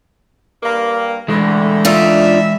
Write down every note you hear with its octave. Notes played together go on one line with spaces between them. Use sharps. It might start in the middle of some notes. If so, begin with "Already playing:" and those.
G2 A#3
D3 E3 G#3 A3
D4 D#4 F4 E5